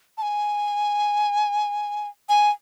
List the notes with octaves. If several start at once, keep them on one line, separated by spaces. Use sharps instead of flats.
A5
G#5
G#5